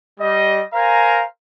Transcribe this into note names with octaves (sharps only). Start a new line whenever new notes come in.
G3 D#5
A#4 C5 F5 G#5 A#5